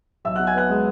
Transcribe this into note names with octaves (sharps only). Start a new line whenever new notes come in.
B1 E5 E6
B2 F#5 F#6
G#5 G#6
B3 F#5 F#6
G#3